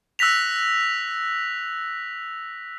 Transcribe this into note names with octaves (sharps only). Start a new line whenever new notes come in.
E6 F#6 A#6 B6 F7